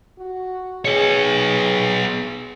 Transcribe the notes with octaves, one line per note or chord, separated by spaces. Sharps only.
F#4
B3 G#4 C#5